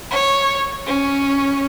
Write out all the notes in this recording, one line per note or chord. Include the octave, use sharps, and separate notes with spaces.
C#5
C#4